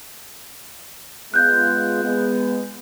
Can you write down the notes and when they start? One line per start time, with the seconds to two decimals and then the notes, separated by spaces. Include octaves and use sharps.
1.34 G#3 B3 F4 F#6 G6
2.04 G#3 B3